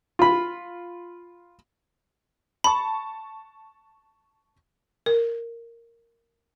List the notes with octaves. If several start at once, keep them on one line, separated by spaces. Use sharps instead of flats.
F4 B5
A5 B5 C#6
A#4